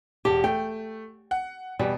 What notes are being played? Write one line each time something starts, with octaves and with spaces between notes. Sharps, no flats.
E1 G4 A5
A3 G5
F#5
E2 B2 G3